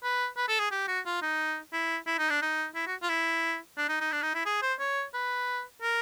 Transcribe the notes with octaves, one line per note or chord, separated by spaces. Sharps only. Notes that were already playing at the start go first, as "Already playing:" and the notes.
B4
B4
A4
G#4
G4
F#4
F4
D#4
E4
E4
D#4
D4
D#4
E4
F#4
F4
E4
D4
D#4
D#4
D4
D#4
E4
G#4
C5
C#5
B4
A#4